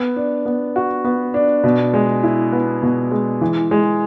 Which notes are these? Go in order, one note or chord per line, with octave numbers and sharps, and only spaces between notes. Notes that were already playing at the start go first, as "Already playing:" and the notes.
Already playing: B3
D4
B3
F#4
B3
D4
B2
G#3
E4
B3
B2
G#3
E3
G#3